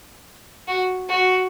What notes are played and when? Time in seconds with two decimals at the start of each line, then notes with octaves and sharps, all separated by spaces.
0.68 F#4
1.09 F#4